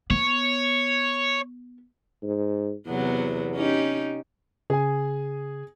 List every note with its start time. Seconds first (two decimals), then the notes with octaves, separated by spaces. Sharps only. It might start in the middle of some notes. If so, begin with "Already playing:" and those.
0.10 B3 C#5
2.23 G#2
2.87 E2 C3 F#3 B3
3.54 C#4 D#4 G4
4.70 C#3 G#4 G#5